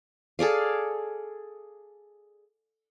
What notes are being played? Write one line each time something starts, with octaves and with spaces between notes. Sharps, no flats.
G#4 A4 D5 F5